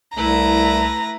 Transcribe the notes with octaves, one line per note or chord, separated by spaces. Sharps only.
C2 A3 E4 B4 A#5